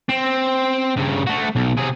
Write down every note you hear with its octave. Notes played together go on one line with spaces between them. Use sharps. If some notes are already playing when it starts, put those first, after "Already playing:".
C4
G2 C#3
A3 F#4
B1
C3 G#4